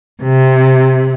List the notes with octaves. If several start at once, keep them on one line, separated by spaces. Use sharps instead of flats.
C3